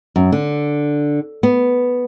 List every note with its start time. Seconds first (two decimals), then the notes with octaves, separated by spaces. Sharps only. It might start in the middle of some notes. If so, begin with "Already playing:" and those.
0.16 F#2
0.32 D3
1.43 B3